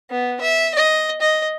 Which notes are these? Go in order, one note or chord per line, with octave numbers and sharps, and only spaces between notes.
B3
E5
D#5
D#5